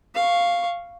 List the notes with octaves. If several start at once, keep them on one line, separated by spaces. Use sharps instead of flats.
F5 C#6